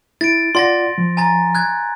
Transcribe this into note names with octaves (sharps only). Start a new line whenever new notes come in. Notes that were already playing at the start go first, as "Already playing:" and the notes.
E4 A6 D7
F4 D5 F#5 C6 A6 A#6
F3
G#5 A#5 A6
F#6 G#6